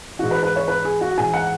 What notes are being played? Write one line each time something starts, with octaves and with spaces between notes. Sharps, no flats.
G#2 E3 F#4
B4
B4
C#5
B4
G#4
F#4
G#2 E3 G#5
F#5